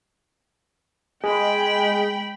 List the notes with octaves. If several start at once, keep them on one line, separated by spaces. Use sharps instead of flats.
G#3 G5 B5